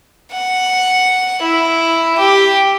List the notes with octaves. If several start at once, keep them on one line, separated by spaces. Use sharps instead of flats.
F#5
E4
G4